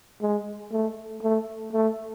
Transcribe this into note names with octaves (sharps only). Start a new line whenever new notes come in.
G#3
A3
A3
A3